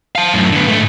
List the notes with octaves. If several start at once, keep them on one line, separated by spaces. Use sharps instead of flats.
F5 A5
F#2 A2
D3 B3
G#2 A3